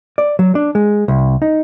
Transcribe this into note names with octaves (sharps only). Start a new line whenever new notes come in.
D5
F#3
D4
G#3
C2
D#4